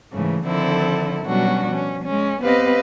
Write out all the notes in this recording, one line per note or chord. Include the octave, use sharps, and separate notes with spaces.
G#2 C#3 E3 A3
D3 D#3 F3 C4 E4 A4
B2 F#3 G3 C#4 D4 F#4
F3 C#4
G#3 C#4
B3 C4 G4 B4 D#5 F5